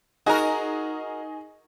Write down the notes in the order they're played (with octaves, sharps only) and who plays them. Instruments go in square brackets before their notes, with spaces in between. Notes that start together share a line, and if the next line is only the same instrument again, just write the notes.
[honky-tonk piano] D#4 G#4 D#5 [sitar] F#4 A#4